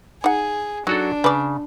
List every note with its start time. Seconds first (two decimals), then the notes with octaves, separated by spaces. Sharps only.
0.24 D#4 G#4 F#5
0.87 F#3 D4 D#4 F#4 A4
1.24 C#3 B4 D5